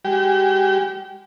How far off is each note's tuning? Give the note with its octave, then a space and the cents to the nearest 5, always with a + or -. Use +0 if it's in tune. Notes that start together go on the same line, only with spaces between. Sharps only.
G#3 -35 G4 -35